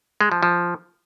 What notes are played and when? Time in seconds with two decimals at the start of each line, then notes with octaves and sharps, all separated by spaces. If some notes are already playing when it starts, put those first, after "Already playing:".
0.21 G#3
0.32 F3
0.43 F3